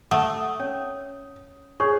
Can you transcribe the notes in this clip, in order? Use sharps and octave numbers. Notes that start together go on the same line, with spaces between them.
A3 F#5 D#6
C#4 C#5
G#4 C5 C#5 C#6